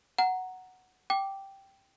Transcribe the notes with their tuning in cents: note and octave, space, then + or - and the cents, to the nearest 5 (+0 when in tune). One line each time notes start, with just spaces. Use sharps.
F#5 +0 A#5 +0
G5 -5 D6 +0